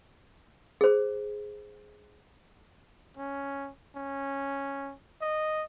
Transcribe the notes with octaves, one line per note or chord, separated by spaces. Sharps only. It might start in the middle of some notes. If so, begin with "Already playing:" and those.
G#4 C5
C#4
C#4
D#5